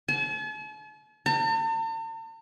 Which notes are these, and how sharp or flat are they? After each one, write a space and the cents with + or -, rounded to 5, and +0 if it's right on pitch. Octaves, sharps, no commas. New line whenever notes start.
A5 -45
A5 +45